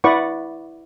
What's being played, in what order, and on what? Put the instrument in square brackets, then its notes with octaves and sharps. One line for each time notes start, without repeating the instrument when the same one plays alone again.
[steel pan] E4 B4 D5 F#5 C#6